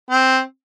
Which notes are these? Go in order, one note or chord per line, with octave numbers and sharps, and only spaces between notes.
C4